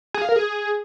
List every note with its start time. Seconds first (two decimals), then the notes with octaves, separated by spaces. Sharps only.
0.14 G#4
0.22 F5
0.29 A#4
0.36 G#4